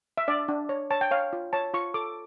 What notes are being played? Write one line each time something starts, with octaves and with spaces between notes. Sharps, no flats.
E5
D4 D5
D4
C#5
C#5 A5
G5
C#5 F5
F4
C#5 A5
F4 C#6
A4 D6